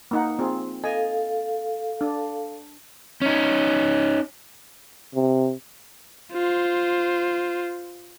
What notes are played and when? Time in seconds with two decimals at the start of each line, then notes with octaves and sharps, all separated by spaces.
0.11 A#3 D#4 F#5
0.39 C4 F4 G#4
0.84 A4 D#5 F5 G#5
2.01 D4
3.22 C#4 D#4
5.15 C3
6.33 F4 C5